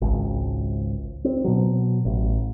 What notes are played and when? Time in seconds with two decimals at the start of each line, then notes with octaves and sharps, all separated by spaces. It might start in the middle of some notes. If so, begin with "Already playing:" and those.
0.01 G#1 C#2
1.24 C4
1.44 B2 F#3
2.05 A1